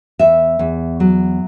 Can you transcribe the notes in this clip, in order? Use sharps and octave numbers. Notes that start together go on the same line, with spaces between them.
E2 E5
E2
F#3